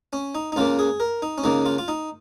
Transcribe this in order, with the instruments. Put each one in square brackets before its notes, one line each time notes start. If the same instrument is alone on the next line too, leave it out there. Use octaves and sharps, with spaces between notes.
[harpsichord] C#4
D#4
D#4
C#2 C#3 A#3 F4
G#4
A#4
D#4
C#4
C#2 C#3 A#3 D#4
F4
F4
D#4